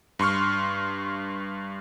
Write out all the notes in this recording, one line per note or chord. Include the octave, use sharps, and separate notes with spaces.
G2 C6 C#6 F6